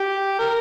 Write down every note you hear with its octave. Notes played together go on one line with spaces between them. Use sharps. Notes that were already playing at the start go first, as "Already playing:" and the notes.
Already playing: G4
A#4